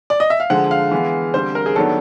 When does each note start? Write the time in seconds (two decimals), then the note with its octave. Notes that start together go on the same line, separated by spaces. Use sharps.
0.10 D5
0.20 D#5
0.30 E5
0.40 F5
0.50 D3 F3 G#3 F#5
0.71 F5
0.91 E3 G#3 B3
1.34 D3 G3 C4 C5
1.55 A#4
1.66 G#4
1.76 D#3 F#3 B3 D4 A4